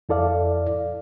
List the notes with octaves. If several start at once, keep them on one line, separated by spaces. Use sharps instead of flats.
F2 E4 A4 D5 F5